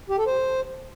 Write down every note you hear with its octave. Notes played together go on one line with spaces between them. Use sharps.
G4
A4
C5